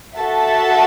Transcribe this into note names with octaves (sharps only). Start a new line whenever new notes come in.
F#4 A4 E5 A5